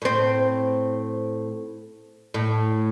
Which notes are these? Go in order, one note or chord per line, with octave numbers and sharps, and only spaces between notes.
A2 C4
A2